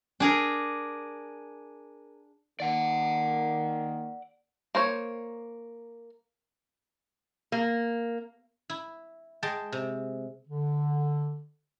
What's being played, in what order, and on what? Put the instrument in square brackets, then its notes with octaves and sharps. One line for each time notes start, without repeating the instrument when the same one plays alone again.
[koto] D4 G#4 A#4
[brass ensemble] D#3 A#3 [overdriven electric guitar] D5 F#5
[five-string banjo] A#3 C5 C#5
[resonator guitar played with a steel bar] A#3
[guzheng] E4
G#3 G5 A5
C3
[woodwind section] D3